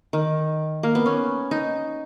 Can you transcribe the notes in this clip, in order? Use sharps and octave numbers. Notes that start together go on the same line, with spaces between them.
D#3
A#3
B3
C#4
D#4